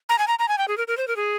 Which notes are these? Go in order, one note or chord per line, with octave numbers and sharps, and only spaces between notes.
A#5
G#5
A#5
A#5
G#5
G5
G#4
A#4
A#4
C5
A#4
G#4